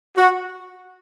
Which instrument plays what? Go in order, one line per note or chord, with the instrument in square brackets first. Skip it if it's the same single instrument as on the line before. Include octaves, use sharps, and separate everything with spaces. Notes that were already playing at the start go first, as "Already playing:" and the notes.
[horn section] F#4